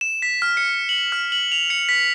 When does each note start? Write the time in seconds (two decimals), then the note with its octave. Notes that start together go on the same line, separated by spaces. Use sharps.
0.01 E7
0.22 B6
0.42 F6
0.57 C#7
0.89 F#7
1.12 F6
1.32 F#7
1.52 F7
1.70 C#7
1.89 B6